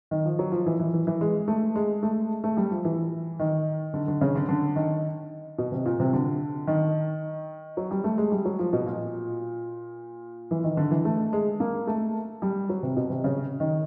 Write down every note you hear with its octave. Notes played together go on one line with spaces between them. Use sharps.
D#3
F3
F#3
F3
E3
E3
E3
E3
G#3
A3
G#3
A3
A3
G3
F3
E3
D#3
D3
D3
C#3
D3
D3
D#3
B2
C3
A#2
C3
D3
D#3
F#3
G3
A3
G#3
G3
F#3
F3
B2
A#2
E3
D#3
D3
E3
A3
G#3
A#3
A3
G3
F#3
C3
B2
C3
C#3
D#3